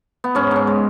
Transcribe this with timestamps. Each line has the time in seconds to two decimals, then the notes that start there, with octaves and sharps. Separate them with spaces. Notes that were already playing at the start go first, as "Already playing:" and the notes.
0.24 B3
0.35 G#2 C#4
0.51 G#2 C#4
0.67 G#3